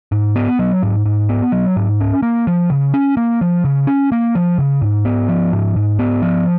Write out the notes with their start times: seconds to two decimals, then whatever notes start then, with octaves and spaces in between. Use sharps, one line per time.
0.12 G#2
0.36 B3
0.59 F#3
0.83 G#2
1.06 G#2
1.29 B3
1.52 F#3
1.77 G#2
2.00 C#4
2.23 A#3
2.47 F3
2.70 C#3
2.94 C#4
3.17 A#3
3.41 F3
3.64 C#3
3.87 C#4
4.12 A#3
4.35 F3
4.58 C#3
4.82 G#2
5.05 B3
5.29 F3
5.53 G#2
5.76 G#2
5.99 B3
6.22 F3